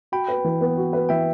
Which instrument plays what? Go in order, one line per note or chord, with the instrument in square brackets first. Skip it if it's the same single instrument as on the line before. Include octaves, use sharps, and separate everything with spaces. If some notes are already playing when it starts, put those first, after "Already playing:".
[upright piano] F#4 [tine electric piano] G5 B5
[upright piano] B4
E3
B3
F#4
B4
[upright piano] E3 [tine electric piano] E5 G5